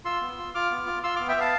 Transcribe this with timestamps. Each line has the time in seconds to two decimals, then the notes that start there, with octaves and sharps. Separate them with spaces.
0.05 F4 C6 E6
0.21 B3
0.38 F4
0.54 F4 D6 F6
0.71 B3
0.87 F4
1.03 F4 C6 E6
1.16 B3 D6 F6
1.28 E5 G5
1.36 B3 F5 A5